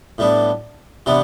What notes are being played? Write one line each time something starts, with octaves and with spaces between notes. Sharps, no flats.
A2 G3 B3 D4
C3 E3 G3 B3 D4